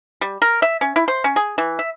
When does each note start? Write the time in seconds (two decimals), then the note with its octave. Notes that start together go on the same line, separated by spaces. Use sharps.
0.21 G3
0.42 A#4
0.62 E5
0.81 C#4
0.96 E4
1.08 C5
1.24 C#4
1.36 G#4
1.58 E3
1.79 E5